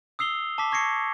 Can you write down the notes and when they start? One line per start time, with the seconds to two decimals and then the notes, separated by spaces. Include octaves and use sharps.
0.19 D#6 E6 C7 F7 G7
0.58 A5 D6 B6
0.72 C#6 G#6 A#6 C7 C#7